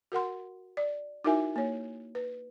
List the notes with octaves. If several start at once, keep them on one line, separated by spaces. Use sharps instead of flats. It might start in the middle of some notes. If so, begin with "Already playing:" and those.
F#4 A#4 F#5 C6
D5
D#4 E4 F#4 A#4 E5 G#5
A#3 C#5
B4